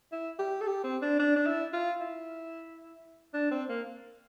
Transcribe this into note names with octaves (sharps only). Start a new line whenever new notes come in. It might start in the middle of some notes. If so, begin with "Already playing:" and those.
E4
G4
A4
G4
C4
D4
D4
D4
E4
F4
E4
D4
C4
A#3